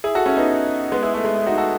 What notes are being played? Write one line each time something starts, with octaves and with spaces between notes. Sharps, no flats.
E4 G#4
F#4 A4
C#4 E4
B3 D#4
G#3 B3
E4 G#4
A3
G#3
A3
D#4 F#4
F#4 A4